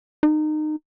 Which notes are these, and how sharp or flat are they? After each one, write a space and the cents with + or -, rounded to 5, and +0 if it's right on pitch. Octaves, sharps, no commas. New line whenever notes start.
D#4 -25